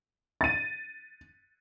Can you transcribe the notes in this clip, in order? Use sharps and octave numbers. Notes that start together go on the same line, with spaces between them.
A6 D#7